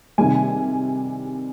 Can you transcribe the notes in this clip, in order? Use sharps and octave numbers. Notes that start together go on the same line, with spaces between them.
C3 D#3 G3 G#5